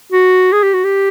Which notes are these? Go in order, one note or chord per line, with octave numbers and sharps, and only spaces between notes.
F#4
G#4
G4
F#4
G4